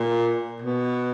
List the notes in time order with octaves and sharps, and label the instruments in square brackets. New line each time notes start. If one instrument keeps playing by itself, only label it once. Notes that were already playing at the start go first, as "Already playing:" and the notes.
Already playing: [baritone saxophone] A#2
B2